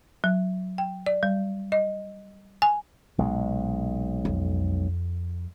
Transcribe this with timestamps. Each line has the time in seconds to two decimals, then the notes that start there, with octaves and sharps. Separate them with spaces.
0.24 F#3
0.78 G5
1.06 D5
1.23 G3
1.72 D#5
2.62 G#5
3.18 B1 A#2 G#3
4.25 F2